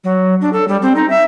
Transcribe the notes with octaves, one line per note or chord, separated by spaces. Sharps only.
F#3
D4
A4
G3
C4
D#4
E5